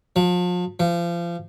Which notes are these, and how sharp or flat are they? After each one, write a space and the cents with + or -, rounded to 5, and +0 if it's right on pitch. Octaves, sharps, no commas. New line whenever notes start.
F3 +35
F3 -30